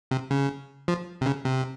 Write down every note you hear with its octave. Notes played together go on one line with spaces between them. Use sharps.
C3
C#3
F3
C3
C#3
C3